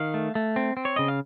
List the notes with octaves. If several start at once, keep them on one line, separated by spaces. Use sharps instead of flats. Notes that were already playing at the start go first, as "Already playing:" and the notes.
Already playing: D#3 F5
A3
A3
C4
C4
C#5
C#3 D#5
F5